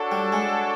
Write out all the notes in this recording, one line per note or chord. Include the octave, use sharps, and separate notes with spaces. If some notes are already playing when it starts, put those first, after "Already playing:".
Already playing: D4 F#4 A4 C#5 F#5
G3
G#3